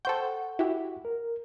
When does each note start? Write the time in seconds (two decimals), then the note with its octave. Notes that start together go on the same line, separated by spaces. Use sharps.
0.05 A4 C5 F#5 G5 C#6
0.59 E4 F#4 G4
1.05 A#4